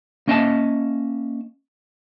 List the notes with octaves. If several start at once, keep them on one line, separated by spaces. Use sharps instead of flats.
A#3 C#4 D#5 E5 G#5 A5